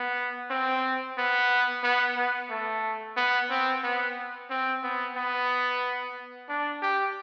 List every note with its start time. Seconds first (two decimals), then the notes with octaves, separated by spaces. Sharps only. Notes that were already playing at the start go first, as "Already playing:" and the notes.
Already playing: B3
0.50 C4
1.18 B3
1.84 B3
2.17 B3
2.50 A3
3.17 B3
3.50 C4
3.84 B3
4.50 C4
4.84 B3
5.17 B3
6.49 D4
6.82 G4